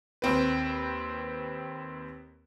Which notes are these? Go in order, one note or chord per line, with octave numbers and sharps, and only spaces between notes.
D#2 C4 B4